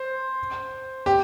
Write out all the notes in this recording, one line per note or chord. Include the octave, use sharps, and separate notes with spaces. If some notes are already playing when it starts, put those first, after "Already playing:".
Already playing: C5
G4